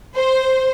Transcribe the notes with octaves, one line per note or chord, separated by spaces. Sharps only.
C5